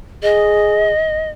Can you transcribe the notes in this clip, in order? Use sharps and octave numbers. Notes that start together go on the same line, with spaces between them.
G#4 D#5